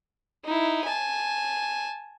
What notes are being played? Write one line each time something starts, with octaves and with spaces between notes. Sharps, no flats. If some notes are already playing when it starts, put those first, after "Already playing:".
D#4 E4
G#5 A5